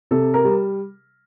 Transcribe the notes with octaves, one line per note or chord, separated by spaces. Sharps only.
C3 A4
A#4
G3